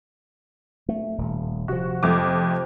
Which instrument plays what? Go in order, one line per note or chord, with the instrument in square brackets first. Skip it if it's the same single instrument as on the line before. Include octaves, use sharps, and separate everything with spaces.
[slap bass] A3
D#1
[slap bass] C3 F3 [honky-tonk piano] F#4
[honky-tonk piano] F2 A3 D6